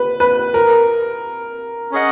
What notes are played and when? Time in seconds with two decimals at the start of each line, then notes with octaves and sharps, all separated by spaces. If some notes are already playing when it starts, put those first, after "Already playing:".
Already playing: B4
0.20 B4
0.54 A#4
1.91 C#4 G#4 D#5 F#5